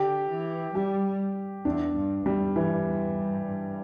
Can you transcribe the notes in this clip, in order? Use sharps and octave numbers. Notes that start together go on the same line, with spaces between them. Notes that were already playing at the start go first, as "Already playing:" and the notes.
Already playing: D3 G4
E3
G3 G4
E2 D4
G2
E2 G3
G2 E3
E2
G2
G2